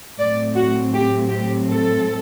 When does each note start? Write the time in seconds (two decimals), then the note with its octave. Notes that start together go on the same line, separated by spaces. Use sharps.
0.19 A2 F#3 C4 D5
0.56 F#4
0.94 G4
1.31 G4
1.69 A4